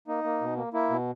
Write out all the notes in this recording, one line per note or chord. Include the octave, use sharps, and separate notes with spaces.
A#3 D#4
A#3
B2
A#3
A#3 E4
B2